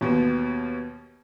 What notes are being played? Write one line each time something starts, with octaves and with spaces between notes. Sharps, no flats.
D#2 B2